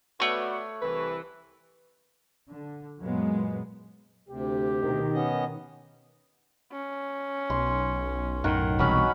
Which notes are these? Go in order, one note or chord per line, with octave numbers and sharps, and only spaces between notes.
A3 B3 F#4 C#5 D5
C2 E3 B4
D3
F#2 A#2 F#3 G#3 B3
D2 C3 G4
B2 D#3
B3 C#4 D#5
C#4
B1 C6
F#2 A2 D#3 A#4 F#5
E1 C2 F#3 C#4 B5